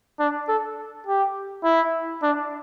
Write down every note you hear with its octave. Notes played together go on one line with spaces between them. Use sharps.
D4
A4
G4
E4
D4